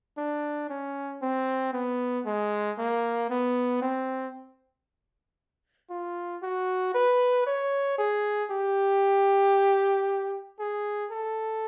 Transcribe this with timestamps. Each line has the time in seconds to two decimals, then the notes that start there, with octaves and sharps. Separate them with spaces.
0.18 D4
0.70 C#4
1.22 C4
1.73 B3
2.26 G#3
2.78 A#3
3.30 B3
3.82 C4
5.90 F4
6.43 F#4
6.95 B4
7.47 C#5
7.99 G#4
8.51 G4
10.60 G#4
11.12 A4